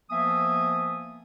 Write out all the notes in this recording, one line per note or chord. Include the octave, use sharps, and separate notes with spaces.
F3 A#3 B3 E5 G#5 D#6